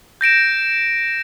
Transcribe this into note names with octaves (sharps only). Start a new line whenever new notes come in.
G6 A#6 D7 E7